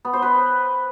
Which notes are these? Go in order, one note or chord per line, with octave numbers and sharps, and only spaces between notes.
B3
C5
B4